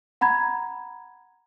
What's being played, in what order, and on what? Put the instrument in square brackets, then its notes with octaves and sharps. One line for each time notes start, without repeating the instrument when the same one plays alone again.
[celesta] F#5 A#5 B5 G#6